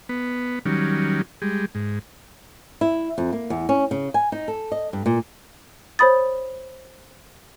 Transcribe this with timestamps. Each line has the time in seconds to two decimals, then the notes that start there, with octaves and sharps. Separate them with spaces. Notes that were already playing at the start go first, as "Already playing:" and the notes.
0.09 B3
0.66 D#3 F#3 G3 C#4
1.42 G3 G#3
1.75 G#2
2.81 E4
3.18 F2
3.32 A#3
3.50 E2
3.69 C#4
3.91 C#3
4.14 G#5
4.32 D#4
4.48 A4
4.72 D#5
4.93 G2
5.06 A#2
5.99 C5 C#5 B5 D#6 A6